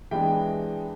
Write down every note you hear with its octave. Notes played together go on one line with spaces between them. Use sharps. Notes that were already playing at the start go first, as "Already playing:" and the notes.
E3 G#3 B3 D4 G5